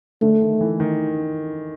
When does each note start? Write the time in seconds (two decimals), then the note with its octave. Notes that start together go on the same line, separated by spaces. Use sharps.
0.22 D3 A3
0.41 D#3
0.61 E3
0.80 D#3